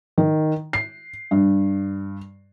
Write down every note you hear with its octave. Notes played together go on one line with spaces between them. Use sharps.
D#3
C7
G2